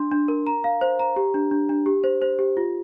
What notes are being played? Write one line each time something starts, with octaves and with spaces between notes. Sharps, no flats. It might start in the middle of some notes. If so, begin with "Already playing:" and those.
Already playing: D4 C6
D4
A#4
A#5
F5
C5
A#5
G4
D4
D4
D4
G4
C5
C5
G4
F4